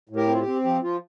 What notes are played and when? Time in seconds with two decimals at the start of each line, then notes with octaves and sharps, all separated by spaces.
0.09 A2
0.16 G4 A#4
0.27 C4
0.34 F4
0.40 G4
0.46 C4
0.64 F3 G4
0.82 F3 F4